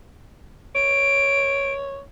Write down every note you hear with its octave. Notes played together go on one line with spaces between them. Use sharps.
C#5 D7